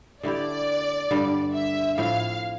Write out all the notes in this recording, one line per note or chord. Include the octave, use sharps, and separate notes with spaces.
D3 A3 E4 G4 D5
G2 D3 G3
E5
A2 F3 C4 E4 F5